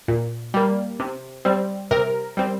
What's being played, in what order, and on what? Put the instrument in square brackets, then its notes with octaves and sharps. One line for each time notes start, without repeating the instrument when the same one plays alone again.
[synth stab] A#2
G3 A#3
C3
G3 C4
C3 A#4
G3 C4